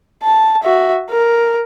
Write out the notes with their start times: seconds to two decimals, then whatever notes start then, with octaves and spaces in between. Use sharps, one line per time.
0.23 A5
0.63 F#4 E5
1.10 A#4